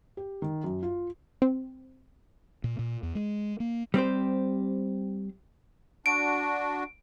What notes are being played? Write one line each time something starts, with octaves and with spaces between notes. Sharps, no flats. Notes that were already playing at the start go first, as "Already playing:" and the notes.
G4
D#3
F#2
F4
C4
A#2
A#2
E2
G#3
A#3
G3 C4 G4 C5
D4 F#4 D7